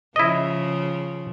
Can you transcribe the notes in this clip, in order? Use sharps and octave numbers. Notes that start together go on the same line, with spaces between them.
C#3 F3 E4 D#5